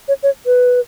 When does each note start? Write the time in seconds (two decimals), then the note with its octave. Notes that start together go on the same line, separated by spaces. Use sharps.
0.08 C#5
0.23 C#5
0.46 B4